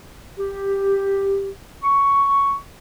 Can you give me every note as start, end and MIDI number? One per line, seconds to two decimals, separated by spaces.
0.38 1.49 67
1.83 2.56 85